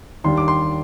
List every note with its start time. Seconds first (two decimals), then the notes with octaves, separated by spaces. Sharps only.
0.24 D#2 D#3 G3 D4 C6
0.37 D6
0.48 C6